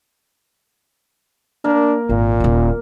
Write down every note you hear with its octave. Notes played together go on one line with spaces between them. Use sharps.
A#3 D4 A#4
G#1 A#2
D#1 F4